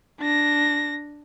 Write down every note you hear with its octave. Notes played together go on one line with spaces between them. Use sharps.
D4 A#6